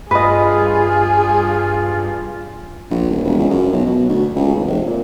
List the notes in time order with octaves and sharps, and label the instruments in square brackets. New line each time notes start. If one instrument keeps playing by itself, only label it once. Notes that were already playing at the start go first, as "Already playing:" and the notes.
[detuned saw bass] G2 [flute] F4 [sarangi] G#4 [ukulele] B4 D#5
[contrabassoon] A#1
D#1
E1
C#2
F#2
B1
B2
D2
C#2
G#1
F1
A#2